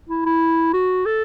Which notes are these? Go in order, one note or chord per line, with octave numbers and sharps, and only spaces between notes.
E4
E4
F#4
A4